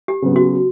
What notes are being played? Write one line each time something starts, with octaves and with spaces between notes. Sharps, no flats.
G4
C#3 F#3 B3
F#4